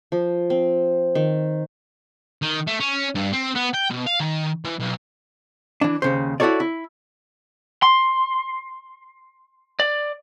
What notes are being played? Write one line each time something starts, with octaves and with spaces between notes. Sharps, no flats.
F3
C4
D#3
D#3
A3
C#4
G2
C4
B3
G5
B2
F5
D#3
E3
B1
E3 D4
D#2 C#3 C5
E4 F#4 G#4 A4 C#5 D5
E4
C6
D5